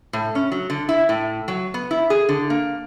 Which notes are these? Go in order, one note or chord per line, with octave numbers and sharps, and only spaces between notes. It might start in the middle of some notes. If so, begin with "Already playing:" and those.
A2
C#4
F#3
D3
E4
A2
F#3
B3
E4
G#4
D3
A#3